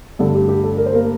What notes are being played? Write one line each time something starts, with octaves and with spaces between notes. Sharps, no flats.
G2 D3 A3 A4
G4
G4
A4
A#4
C5
A#3 A#4